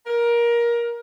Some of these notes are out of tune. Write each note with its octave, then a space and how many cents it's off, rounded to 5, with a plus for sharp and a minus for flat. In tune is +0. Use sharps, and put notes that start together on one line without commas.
A#4 +20